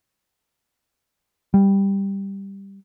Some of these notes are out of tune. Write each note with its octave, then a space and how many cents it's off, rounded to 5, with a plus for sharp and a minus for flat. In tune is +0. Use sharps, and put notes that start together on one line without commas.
G3 +5